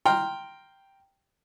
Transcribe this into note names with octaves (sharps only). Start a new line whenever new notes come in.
G5 A#5 C6 F6